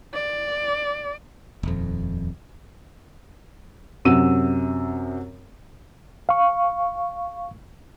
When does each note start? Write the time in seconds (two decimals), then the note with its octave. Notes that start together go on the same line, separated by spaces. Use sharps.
0.14 D5
1.63 D#1 F2
4.05 F#2 C3 F#4 E6 D#7
6.29 F5 C#6